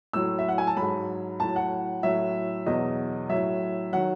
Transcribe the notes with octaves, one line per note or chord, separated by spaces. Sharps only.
A2 F#3 E6
E5
F#5
G#5
A5
G#2 F#3 B5
A2 F#3 A5
F#5
A2 F#3 E5
E2 B2 F#3 D#5
A2 F#3 E5
D#3 F#3 F#5